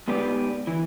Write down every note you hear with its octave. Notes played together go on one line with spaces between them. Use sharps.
G#2 B3 G4 B4 D5
E3